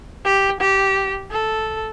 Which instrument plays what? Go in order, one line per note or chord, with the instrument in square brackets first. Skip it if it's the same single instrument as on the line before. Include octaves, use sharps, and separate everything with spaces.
[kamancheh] G4
G4
A4